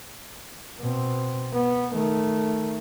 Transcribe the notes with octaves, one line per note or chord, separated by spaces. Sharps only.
B2 C4
B3
D#3 A3